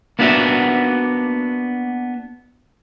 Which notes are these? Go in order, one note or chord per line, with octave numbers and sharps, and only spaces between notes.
A#3 B3 D4 F#4 E5